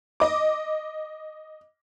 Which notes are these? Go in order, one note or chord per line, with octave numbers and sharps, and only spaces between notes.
D#5 D6